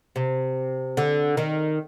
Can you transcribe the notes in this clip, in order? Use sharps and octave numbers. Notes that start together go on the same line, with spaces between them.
C3
D3
D#3